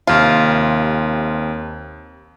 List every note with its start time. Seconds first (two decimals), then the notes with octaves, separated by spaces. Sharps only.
0.07 D#2 C3 F4